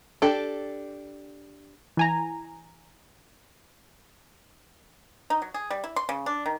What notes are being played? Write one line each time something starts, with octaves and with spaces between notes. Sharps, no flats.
D4 G4 A4
E3 G#5 A#5
D#4
F#3
G#4
G3
E4
C6
C#3
D4
D#3